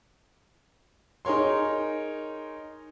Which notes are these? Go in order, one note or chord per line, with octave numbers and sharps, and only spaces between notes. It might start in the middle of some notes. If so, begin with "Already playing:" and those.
D#4 G#4 A#4 C#5 C6